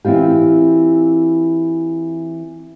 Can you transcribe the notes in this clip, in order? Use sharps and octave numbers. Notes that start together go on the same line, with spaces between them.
E3 C4 E4 F4 G4